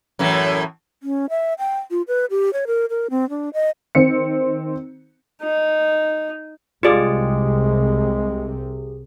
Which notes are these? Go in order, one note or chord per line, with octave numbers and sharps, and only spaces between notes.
F#2 A2 E3
C#4
E5
G5
F4
B4
G4
C#5
A#4
A#4
C4
D4
D#5
D#3 C4 C#7
D#4
C2 C3 G#3 F4 G4 G#4 D5